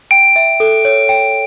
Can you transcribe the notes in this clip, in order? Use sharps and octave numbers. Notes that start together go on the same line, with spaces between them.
G5 D7
E5
A4
C#5
G5